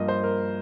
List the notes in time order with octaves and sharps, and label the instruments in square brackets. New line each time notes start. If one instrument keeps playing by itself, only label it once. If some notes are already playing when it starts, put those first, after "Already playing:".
Already playing: [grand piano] G2 F3 A#3 D#5
C5
A#4